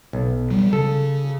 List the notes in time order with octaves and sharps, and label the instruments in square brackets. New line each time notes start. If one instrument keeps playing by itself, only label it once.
[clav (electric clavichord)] B1
[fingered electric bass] F#3 G3
[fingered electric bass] C#3 [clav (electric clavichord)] A4